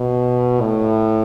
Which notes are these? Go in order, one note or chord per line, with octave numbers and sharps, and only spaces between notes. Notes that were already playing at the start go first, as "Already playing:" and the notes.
Already playing: B2
A2